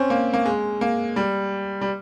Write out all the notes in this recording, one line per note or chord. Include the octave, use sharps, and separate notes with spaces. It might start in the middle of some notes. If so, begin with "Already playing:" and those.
Already playing: C4 C#4
A#3
A#3
G#3
A#3
G3
G3